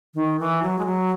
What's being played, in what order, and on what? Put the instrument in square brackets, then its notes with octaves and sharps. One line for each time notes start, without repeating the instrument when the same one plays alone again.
[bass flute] D#3
E3
F#3
G#3
F#3